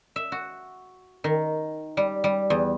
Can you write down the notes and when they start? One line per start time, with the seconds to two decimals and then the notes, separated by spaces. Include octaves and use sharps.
0.16 E5
0.32 F#4
1.24 D#3
1.97 G3
2.24 G3
2.50 E2